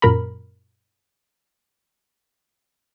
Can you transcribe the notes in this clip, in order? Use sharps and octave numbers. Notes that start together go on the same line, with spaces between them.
F#2 A#2 A#4 A#5 B5